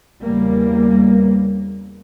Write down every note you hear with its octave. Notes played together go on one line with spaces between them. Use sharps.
E2 C#3 G3 A#3